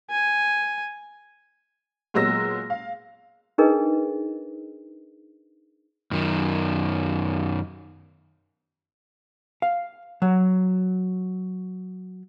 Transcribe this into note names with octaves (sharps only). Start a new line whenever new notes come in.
G#5
A#2 F#3 G#3 B3 E6 A#6
F5
D4 D#4 G#4 A#4 B4 D#5
F#2 D#3
F5
F#3